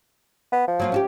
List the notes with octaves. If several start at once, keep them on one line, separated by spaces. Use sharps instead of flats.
B3
F3
F#3 A#3 F4
C#4 F#4 G4